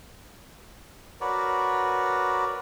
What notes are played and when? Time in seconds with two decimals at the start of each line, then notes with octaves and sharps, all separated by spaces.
1.21 F#4 A#4 B4 C#5 D5